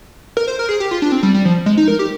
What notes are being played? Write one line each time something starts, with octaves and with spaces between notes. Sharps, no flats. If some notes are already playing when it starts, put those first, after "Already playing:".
A#4
C5
A#4
G#4
G4
F4
D4
C4
G3
G3
F3
G#3
D#4
A#4
G4